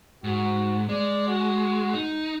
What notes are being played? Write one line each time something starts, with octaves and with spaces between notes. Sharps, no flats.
G#2 F#4
G#3 D5
F#4
D#4